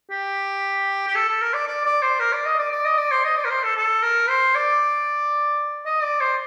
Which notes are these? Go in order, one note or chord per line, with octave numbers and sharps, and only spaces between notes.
G4
G4
A4
A4
A#4
D5
D5
D5
C5
A#4
D5
D#5
D5
D5
D#5
D5
C5
D#5
D5
A#4
C5
A4
A4
A#4
C5
D5
D#5
D5
C5